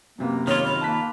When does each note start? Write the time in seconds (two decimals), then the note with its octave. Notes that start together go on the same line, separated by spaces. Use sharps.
0.18 F#2 C3 A#3 B3
0.47 D#3 F4 C#5
0.66 B5
0.81 A#3 A5 F#6 B6